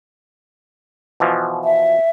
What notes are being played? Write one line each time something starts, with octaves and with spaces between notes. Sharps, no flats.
B2 E3 F3
E5